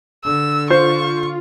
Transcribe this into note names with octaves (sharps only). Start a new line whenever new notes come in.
D3 E6
F4 C5 C#6